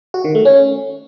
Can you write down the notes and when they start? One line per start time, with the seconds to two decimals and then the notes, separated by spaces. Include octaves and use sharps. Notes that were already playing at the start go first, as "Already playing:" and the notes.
0.14 F#4
0.24 D#3
0.35 A3
0.45 C#4